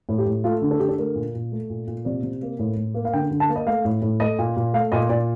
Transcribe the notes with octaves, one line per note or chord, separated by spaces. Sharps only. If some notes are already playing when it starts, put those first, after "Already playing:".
A2
G4
A2
A3 F4
D3
A4
D3 G4
A4
A3 A#4
A#2
A#2
A3
A#2
A#2
C3 D5
C3
A#3
A2
A2
A#3
F5
D3 G5
D3
A5
A#3
D#5
A3 F5
A2
A2
A3 D#5
A#2
A#2
A3 F5
A#2 D#5
A#2 D5